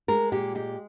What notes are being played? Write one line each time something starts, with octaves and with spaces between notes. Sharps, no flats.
G#3 A#4
A#2 G4
G#3 G4